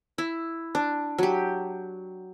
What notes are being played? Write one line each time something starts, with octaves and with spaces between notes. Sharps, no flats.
E4
D4
F#3 G4